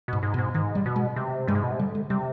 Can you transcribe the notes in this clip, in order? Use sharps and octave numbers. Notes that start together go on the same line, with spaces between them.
G#2 B2
G#2
B2
G#2
G#2 D#3
G3
B2
G#3
C3
G2 G#3
G#2
B2
C3
D3 G3
G#3
C3 G3